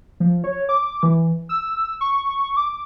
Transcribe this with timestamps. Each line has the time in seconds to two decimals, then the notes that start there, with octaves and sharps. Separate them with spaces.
0.20 F3
0.44 C#5
0.69 D6
1.03 E3
1.49 E6
2.01 C#6
2.57 D6